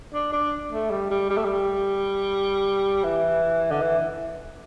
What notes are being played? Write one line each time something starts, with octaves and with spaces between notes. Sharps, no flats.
D4
D4
A3
G3
G3
G3
A3
G3
E3
D3
E3